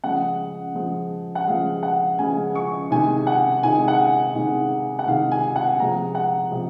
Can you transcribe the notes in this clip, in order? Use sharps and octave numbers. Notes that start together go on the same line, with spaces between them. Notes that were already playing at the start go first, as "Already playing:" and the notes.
C#3 F3 G#3 F#5
C#3 F3 G#3
F#5
C#3 F3 G#3 F5
F#5
C#3 F3 G#3 G#5
C#6
C3 D#3 G#3 G#5
F#5
C3 D#3 G#3 G#5
F#5
C3 D#3 G#3
F#5
C3 D#3 G#3 F5
G#5
F#5
C3 F3 G#3 A#5
F#5
C3 F3 G#3